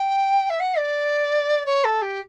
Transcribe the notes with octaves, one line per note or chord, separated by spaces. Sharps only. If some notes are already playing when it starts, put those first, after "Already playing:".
Already playing: G5
E5
F#5
D5
C#5
A4
G4